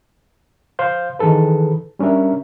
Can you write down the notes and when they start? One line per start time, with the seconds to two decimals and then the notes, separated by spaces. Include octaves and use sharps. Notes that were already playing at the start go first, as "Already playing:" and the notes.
0.79 C5 F5 G6
1.19 D#3 E3 G#4 A4 B4
1.99 G3 C#4 D4 A#4 E5